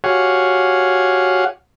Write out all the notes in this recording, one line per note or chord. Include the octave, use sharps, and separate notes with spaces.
F#4 G4 C#5 F5 F#5 G#5